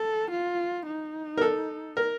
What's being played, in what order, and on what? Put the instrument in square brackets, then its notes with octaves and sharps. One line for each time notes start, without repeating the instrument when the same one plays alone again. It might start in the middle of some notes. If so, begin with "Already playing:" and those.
Already playing: [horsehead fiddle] A4
F4
D#4
[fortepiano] A#4
A4
A#4